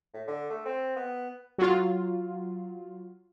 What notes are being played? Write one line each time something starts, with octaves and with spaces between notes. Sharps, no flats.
A2
D3
A3
C4
B3
F#3 F4